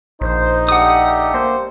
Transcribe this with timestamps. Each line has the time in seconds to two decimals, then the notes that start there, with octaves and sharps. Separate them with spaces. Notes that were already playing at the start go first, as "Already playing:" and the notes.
0.21 A#1 D#4 C5
0.69 A3 D4 G4 F#5 D#6
1.34 A#3 C5